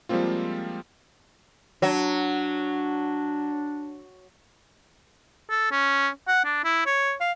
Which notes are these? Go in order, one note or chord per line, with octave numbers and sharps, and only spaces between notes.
F3 G3 G#3 A#3 C4 F4
F#3 D4
A4
C#4
F#5
D4
E4
C#5
F5